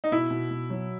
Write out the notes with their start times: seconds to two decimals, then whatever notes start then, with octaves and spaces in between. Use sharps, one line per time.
0.04 D#4
0.12 B2 E4
0.31 B2
0.51 B2
0.70 F#3